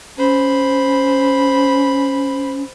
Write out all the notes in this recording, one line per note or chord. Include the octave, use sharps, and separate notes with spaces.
C#4 C5 B5